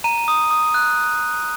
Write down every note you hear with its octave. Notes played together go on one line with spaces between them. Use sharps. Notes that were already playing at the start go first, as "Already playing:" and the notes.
A#5 D#7
D#6
D#6
F#6